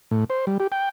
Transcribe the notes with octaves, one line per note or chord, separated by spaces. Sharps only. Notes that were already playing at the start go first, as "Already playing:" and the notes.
A2
C5
G3
G4
G5